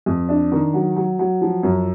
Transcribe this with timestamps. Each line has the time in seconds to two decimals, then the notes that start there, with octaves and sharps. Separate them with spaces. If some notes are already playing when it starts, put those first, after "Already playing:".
0.06 F2
0.29 D4
0.52 D#3
0.74 F#3
0.96 F#3
1.19 F#3
1.41 F3
1.63 F#2